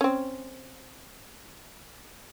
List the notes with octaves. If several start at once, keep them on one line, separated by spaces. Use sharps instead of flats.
C4 C#4